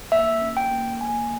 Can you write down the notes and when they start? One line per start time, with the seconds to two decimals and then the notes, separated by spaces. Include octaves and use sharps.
0.12 A#3 E5
0.41 C#4
0.57 G5
0.72 A#3
1.01 A#3 G#5